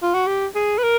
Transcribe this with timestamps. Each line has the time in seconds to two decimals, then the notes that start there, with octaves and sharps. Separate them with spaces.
0.03 F4
0.14 F#4
0.27 G4
0.55 G#4
0.78 B4
0.83 A#4